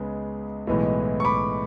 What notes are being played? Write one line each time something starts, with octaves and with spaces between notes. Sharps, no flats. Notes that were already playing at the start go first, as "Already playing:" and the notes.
Already playing: C#2 C#3 G#3 B3
B1 A2 E3 G#3 B3
C#6
B5 D6